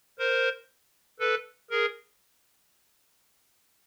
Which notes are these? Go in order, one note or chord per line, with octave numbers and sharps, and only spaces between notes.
A#4 C5
A4 B4
G#4 A#4